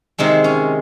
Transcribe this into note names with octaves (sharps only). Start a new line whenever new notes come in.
C3 D#3 G#3 C4
C#4